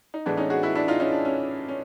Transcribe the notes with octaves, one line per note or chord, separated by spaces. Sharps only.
D#4
A2 E3 G#3 B3 D4
C#4 D#4
F#4 G#4
E4 F#4
D4 E4
D#4 F4
C#4 D#4
D4
C#4
C#4